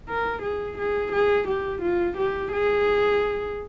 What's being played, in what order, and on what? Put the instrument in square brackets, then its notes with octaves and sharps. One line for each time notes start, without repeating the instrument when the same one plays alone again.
[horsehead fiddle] A#4
G#4
G#4
G#4
G4
F4
G4
G#4